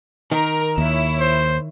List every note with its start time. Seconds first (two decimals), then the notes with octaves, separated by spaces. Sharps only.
0.31 D#3 A#4
0.78 D#2 E4 C#5 E6
1.20 C5